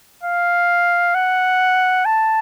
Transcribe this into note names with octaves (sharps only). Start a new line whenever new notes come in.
F5
F#5
A5